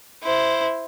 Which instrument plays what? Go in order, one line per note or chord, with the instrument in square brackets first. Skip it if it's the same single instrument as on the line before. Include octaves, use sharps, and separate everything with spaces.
[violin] E4 C5